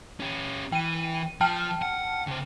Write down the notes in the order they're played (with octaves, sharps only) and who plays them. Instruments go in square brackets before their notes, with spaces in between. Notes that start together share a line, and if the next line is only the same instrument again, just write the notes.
[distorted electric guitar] C#4 G4
[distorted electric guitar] E3 [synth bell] G5 D#7
[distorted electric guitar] F3 [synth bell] G5 A5 F6
[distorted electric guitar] F#5
C#3 C5